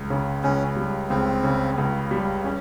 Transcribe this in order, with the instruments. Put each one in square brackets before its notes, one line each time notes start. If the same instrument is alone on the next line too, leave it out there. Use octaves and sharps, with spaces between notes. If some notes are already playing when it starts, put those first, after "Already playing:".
Already playing: [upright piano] C#2
C#3
[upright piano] C#2 [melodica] C#4
[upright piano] G3
[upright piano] C#2 [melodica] C4
[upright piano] C#3
C#2
G3
C#4